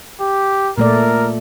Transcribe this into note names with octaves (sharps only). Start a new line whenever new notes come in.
G4
A#2 A3 A#4 D5